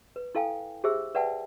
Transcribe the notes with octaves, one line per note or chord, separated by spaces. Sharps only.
B4
E4 A4 F5 G5 G#5
G4 G#4 C5 E5 E6
B4 D5 E5 F#5 G5 A5